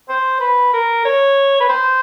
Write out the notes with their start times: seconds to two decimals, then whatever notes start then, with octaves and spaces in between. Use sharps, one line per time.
0.09 C5
0.40 B4
0.73 A#4
1.05 C#5
1.60 B4
1.69 C5